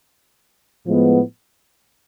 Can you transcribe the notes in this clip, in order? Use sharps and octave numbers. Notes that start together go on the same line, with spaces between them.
A2 F3 G#3 B3